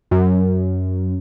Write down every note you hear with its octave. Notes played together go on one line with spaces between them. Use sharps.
F#2